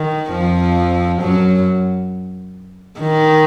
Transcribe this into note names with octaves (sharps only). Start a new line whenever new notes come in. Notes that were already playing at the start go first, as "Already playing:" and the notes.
Already playing: D#3
F2 F3
F#2 F#3
D#3